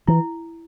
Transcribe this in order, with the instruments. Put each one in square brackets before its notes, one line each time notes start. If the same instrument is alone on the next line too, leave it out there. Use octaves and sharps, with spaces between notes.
[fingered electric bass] E3 [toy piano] E4